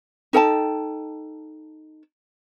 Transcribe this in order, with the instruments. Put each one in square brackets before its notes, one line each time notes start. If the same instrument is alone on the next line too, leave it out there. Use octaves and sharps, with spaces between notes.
[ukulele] D#4 A4 G5 A5